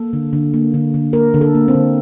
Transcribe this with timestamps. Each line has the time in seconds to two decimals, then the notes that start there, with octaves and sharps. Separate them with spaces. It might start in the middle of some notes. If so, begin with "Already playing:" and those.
Already playing: A#3 A4
0.13 D3
0.33 D3
0.54 A#3
0.74 D3
0.94 D3
1.13 A#3 A#4
1.34 D3
1.41 A4
1.54 A#3
1.68 C4
1.75 D3